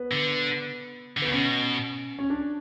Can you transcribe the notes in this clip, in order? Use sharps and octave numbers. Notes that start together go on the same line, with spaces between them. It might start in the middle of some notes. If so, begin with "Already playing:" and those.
Already playing: B3
D3
D3
C#3 B3
B2 C#4
C#4
D4